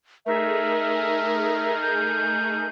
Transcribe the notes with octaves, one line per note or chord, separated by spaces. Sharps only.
A3 D#4 G#4 A#4 E5
G6